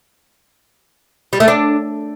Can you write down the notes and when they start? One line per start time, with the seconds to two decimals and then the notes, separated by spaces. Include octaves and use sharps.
1.33 G3
1.40 A3
1.48 D4